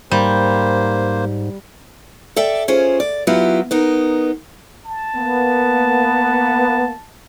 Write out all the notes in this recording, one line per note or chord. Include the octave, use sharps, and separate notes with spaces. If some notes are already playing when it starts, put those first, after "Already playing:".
G#2 G3 A#3 C5
A4 D5 E5 G5
C#4 F4 G#4 C5
D5
F#3 B3 E4 F4 G4
B3 D#4 A#4
A5
A#3 B3